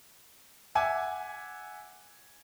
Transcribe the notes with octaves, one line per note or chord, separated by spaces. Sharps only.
E5 F#5 G#5 D6